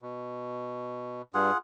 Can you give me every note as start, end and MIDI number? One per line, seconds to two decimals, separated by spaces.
0.02 1.22 47
1.34 1.51 43
1.34 1.57 65
1.34 1.57 68
1.34 1.57 78